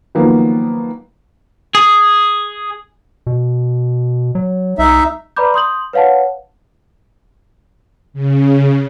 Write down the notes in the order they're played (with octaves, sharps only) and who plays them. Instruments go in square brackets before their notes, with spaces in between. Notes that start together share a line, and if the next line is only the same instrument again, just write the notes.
[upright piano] D#3 F3 F#3 A#3 B3
[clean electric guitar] G#4
[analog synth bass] B2
F#3
[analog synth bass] C2 [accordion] D#4 E5
[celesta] B4 D5 A#5 B5 D6 G6
C6 D#6 G6 F#7
B4 C#5 F5 F#5 A5
[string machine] C#3